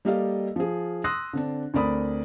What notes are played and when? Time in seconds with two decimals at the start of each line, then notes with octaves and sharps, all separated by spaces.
0.05 G3 A#3 G4 A4 D#5 F5
0.56 F3 G#4
1.04 C6 D#6 E6 F#6 A#6
1.33 D3 C4 D4
1.74 D2 C4 A#4 D5 B5 D#6